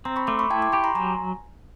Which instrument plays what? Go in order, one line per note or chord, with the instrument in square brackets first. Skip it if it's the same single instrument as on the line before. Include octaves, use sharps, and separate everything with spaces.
[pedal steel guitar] C4 [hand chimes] A#5 C6
[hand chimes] B5 C#6
[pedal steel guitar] A3 [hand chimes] C6 D6
[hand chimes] B5 C#6
[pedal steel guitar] E4 [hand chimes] G5 A5
[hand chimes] C6 D6
[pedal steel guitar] G4 [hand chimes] B5 C#6
[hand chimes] A#5 C6
[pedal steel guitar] F#3 [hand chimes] G#5 A#5